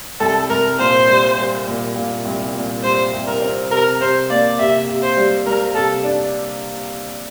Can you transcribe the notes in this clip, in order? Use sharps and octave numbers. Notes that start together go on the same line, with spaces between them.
C2 A4
C2 A#4
A#2 C5
G3
G3
A#2
A#2
C2
A#2
G3 C5
C2
A#4
C4
C3 A#4
C3 C5
A#3 D5
C3 E5
C3
C5
G3
G3 A#4
C3 A4
D4